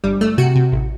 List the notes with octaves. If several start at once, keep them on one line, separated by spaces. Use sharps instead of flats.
G1 G3
G1 A3
C3 F#4
C3
A1